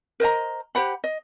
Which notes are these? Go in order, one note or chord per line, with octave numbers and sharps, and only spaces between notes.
A#4 C5 D#5 A#5
G4 C5 F#5 B5
D#5